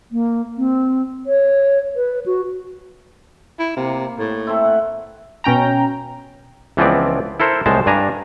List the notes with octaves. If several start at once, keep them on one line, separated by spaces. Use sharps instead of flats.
A#3
C4
C#5
B4
F#4
E4
C3 A#3
A2
A3 C4 E4
F#5
B2 C#4 G5 A#5
C#2 E3 F3 B3 C4 D5
E4 A4 A#4 C5
C2 A2 G#3 C5 A5
G2 D4 G#5 A#5